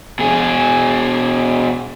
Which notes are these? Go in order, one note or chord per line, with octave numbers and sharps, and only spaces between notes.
B2 G#4